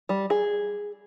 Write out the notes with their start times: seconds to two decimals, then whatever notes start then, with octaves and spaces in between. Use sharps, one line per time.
0.09 G3
0.30 G#4